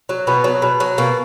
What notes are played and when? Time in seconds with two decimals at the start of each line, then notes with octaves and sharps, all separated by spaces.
0.09 F#3
0.27 B2 B3
0.44 F#3
0.62 B2
0.80 F#3
0.98 B2 A#3